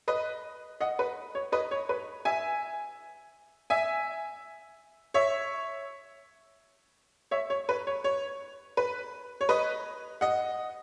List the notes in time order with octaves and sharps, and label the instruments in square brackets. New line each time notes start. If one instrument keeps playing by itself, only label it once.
[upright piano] B4 D#5
D#5 F#5
B4
C#5
B4 D#5
C#5
B4
E5 G#5
E5 G#5
C#5 E5
C#5 E5
C#5
B4
C#5
C#5
B4
C#5
B4 D#5
D#5 F#5